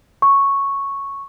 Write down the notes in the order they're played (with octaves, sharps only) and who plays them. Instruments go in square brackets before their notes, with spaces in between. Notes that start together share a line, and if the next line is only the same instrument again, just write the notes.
[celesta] C#6